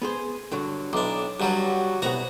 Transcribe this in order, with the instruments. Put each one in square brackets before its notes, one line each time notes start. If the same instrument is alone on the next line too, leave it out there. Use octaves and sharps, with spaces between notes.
[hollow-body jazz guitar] B3 G#4 C5
G2 D3 F#3
[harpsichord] B1 D4 [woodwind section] E3 D6 [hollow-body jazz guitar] C6
[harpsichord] G2 F#3 G3 [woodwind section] F#4
[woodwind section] C2 [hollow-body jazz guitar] B2 B3 F#5 [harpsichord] F#4 A#5